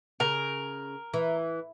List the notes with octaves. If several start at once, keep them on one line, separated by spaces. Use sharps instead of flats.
C#3 A#4
E3